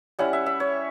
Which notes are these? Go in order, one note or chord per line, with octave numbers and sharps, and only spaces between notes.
G3 C#4 E4 F#5
E5
E5
C#5